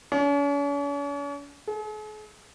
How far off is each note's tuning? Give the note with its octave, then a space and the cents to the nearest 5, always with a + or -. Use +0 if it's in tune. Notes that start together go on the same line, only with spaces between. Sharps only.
C#4 +45
G#4 +45